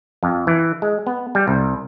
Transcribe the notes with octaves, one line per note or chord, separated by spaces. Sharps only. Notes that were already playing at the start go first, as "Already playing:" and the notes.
F2
E3
G#3
B3
G3
C2